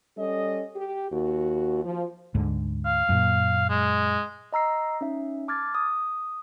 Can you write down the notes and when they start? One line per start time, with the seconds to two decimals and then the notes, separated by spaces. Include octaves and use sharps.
0.16 G3 C#4 A4 D#5
0.76 G4
1.11 D#2 F#4
1.83 F3
2.35 D2 G#2 D3
2.86 F5
3.09 F#2 A#2
3.70 G#3
4.53 D#5 A#5 E6 C7
5.01 C#4 D#4 E5
5.48 A5 D6 F6 G#6 A6
5.75 D#6